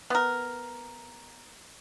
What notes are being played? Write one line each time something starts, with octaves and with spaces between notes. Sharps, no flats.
B3 A#4